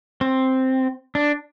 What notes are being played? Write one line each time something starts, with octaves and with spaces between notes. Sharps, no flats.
C4
D4